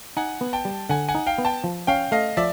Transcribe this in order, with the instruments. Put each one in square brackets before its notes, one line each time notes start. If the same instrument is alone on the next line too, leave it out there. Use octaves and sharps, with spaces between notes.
[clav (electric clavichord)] D#4 [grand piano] F#5 G#5
[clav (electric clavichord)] B3
[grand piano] G5 A5
[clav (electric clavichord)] G3
[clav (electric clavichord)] D3 [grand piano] F#5 G#5
[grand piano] F#5 G#5
[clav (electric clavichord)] D#4
[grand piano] F5 G5
[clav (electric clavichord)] B3
[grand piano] G5 A5
[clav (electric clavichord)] F3
[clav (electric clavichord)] C#4 [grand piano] F5 G5
[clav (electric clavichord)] A3 [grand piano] D#5 F5
[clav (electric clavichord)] F3 [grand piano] D5 E5